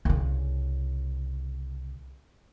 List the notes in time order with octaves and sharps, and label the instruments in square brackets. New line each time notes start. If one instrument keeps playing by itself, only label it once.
[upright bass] C2 C#3